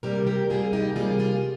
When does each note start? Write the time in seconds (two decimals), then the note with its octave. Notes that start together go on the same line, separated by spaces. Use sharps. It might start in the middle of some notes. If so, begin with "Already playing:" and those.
0.03 C3 G3 A#3 G4 A#4
0.27 G4 A#4
0.50 C3 G3 A#3 F4 G#4
0.73 D#4 G4
0.96 C3 G3 A#3 F4 G#4
1.19 F4 G#4